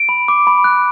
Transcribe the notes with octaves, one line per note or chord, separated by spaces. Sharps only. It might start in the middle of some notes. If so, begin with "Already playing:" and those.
Already playing: D7
B5
D6
B5
F#6